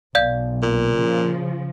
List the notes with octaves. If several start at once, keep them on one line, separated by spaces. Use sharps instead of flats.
B1 D5 F5 G6
A#2
C#3 F3